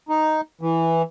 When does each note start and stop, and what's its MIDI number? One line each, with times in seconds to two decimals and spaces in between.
0.09 0.41 63
0.61 1.02 52